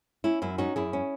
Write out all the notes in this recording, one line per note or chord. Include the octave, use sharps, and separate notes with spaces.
C#4 E4
F#2 E4
C#4 D#4 F#4
F#2 E4 G#4
C#4